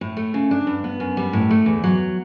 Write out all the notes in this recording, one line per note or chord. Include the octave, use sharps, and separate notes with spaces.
A2
A3
C#3
D4
G2
B3
F#2
G3
A2
A3
E2
F#3